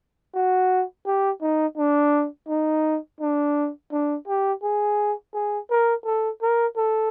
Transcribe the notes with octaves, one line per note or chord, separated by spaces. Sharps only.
F#4
G4
D#4
D4
D#4
D4
D4
G4
G#4
G#4
A#4
A4
A#4
A4